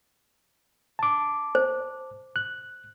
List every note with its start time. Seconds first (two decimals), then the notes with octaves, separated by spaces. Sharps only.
0.99 A5 D6
1.55 C5
2.36 F#6